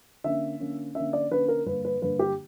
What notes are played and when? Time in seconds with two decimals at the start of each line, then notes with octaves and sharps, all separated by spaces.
0.24 D3 A#3 C#4 E5
0.60 D3 A#3 C#4
0.95 D3 A#3 C#4 E5
1.13 D5
1.31 D3 A#3 C#4 B4
1.48 A#4
1.66 G2 D3 A#3 B4
1.85 B4
2.02 G2 D3 A#3 B4
2.19 G4